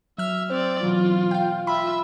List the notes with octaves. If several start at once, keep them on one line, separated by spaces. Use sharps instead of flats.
F#3 E5 F6
C4 C5 D5
B2 E3 F#3 F4
F5 G5
F4 E5 B5